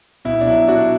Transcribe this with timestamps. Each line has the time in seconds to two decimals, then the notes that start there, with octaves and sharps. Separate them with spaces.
0.25 B2 E4
0.41 D4
0.47 F#3 E4
0.68 B2 D4 F#4